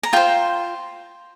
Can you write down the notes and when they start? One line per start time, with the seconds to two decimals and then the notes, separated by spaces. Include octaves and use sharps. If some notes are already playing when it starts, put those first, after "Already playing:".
0.03 A#5
0.13 F4 C5 G5